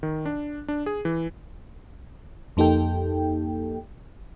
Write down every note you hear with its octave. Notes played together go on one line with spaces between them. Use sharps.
D#3
D4
D4
G#4
E3
F2 A#3 D#4 G4 A4 G5